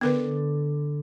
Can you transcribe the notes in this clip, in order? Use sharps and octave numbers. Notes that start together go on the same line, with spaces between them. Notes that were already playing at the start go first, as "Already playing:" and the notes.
D3 B3 D4 A#4 B4